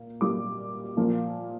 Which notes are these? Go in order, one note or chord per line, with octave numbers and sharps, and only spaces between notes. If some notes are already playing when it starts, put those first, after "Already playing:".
Already playing: A#2 A#3
A#2 G3 A#3 D6
A#2 F3 A#3